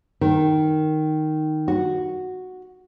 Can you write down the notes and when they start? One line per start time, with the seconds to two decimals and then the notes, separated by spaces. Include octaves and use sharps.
0.21 D#3
1.68 F#4